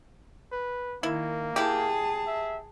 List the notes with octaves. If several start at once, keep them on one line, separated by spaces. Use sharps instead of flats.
B4
D#3 A#3 E4
E4 G4 G#4 A5
E5